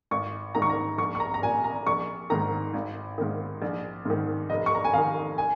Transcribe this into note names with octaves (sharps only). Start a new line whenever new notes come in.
G#1 C#6
G#2 D#3 A#5
C#6
A#5
A#1 C#6
C#6
A#5
A#5
A#2 G#5
A#5
A#1 C#6
G#2 D#3 A#5
G#1
G#2 D#3
A#1
G#2 D#3
F1 D#5
C#6
A#5
G#5
F2 D#3 F5
G#5